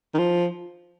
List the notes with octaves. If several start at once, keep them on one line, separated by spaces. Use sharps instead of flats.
D#3
F3